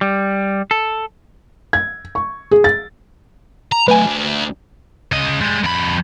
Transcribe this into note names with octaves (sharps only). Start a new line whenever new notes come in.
G3
A4
G#6
C#6
G#4
A6
A#5
F#3 A3 B4 G#5
D2
C#3 D#5
G3 G#3
F2 B5